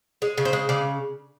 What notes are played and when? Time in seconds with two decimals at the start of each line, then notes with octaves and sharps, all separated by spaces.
0.22 G#3
0.38 C#3
0.45 C5
0.53 G#3
0.69 C#3 D5